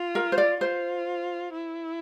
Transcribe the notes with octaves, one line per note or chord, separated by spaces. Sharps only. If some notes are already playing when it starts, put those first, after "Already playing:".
Already playing: F4
A#4
C5
D5
F4 C5
E4